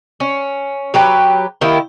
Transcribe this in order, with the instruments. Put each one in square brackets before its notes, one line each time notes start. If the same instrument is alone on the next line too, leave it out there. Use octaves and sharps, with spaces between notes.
[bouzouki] C#4
F#3 G4 B4
D#3 A#3 E4 G4